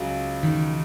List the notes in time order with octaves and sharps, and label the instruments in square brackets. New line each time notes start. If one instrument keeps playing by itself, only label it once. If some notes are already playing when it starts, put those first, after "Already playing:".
Already playing: [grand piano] C#2 C#3 F#3
[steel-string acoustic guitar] D#3